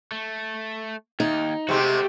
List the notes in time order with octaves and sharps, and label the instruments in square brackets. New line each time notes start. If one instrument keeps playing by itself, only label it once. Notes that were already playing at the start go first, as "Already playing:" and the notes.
[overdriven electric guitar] A3
[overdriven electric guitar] D#2 [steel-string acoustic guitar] D#4
[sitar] C3 G#3 C4 [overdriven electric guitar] A3 F#4 [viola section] G4